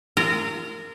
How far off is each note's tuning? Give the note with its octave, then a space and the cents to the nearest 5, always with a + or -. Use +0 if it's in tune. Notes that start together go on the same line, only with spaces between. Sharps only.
F4 -30 A#4 -20